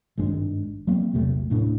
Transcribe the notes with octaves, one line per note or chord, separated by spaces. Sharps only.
G#1 G2 G#3 D4
F#3 A#3 C4
A#1 E2 C3 A3
D1 A2 D4